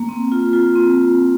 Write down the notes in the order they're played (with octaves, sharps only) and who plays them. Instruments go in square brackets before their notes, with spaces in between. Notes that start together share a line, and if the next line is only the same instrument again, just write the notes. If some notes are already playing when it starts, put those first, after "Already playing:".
Already playing: [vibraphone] A#3
C4
F4
F4
C4